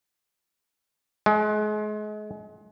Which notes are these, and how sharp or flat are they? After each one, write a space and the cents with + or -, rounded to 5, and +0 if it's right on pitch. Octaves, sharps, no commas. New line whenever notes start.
G#3 +35